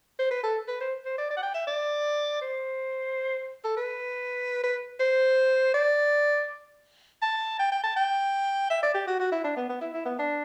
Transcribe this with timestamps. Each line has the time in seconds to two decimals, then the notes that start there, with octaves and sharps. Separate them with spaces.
0.19 C5
0.31 B4
0.43 A4
0.68 B4
0.80 C5
1.05 C5
1.18 D5
1.31 D5
1.37 F#5
1.43 G5
1.54 E5
1.67 D5
2.41 C5
3.64 A4
3.77 B4
4.63 B4
5.00 C5
5.74 D5
7.22 A5
7.59 G5
7.72 G5
7.84 A5
7.96 G5
8.70 E5
8.83 D5
8.94 G4
9.07 F#4
9.20 F#4
9.32 E4
9.44 D4
9.56 B3
9.69 B3
9.81 E4
9.94 E4
10.05 B3
10.19 D4